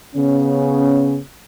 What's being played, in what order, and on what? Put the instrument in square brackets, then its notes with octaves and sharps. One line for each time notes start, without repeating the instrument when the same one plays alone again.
[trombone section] C#3 B3 C#4